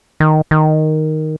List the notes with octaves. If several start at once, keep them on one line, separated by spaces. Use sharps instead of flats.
D#3
D#3